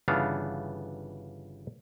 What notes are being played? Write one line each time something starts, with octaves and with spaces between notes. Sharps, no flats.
G1 C#3 E3 B3 D4 F5